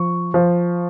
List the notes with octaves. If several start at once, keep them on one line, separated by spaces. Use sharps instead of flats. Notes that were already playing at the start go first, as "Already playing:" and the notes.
Already playing: F3 C#6
F3